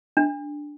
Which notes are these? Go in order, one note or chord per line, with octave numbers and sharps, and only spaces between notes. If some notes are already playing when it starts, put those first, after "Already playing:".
D4